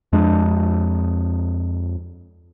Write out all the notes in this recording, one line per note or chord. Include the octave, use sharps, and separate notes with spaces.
F2 G#3 D4